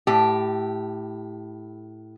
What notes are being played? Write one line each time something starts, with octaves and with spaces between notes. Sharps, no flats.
A2 G4